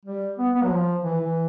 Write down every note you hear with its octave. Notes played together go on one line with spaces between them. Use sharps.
G3
B3
B3
F#3
F3
E3
E3